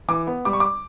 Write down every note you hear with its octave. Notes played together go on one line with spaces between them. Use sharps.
E3 D6
B3
G3 D6
C#6
D6